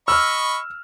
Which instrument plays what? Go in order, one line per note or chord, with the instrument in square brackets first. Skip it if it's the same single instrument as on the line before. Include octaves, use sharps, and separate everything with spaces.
[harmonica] D#5 B5 C#6 [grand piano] E6 F6